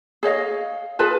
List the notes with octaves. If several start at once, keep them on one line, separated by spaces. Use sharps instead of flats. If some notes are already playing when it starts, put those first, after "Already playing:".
G#4 C#5 D#5 F5
F4 G#4 B4 A5